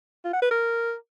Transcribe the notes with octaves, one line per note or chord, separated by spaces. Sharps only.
F4
F#5
B4
A#4